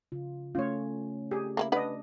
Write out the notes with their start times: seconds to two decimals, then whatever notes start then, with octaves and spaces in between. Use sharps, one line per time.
0.12 C#3 F4
0.55 A3 C#4 F4 C#5
1.31 G4 G#4
1.57 A#3 C4 E4
1.72 D4 B4 D#5 F#5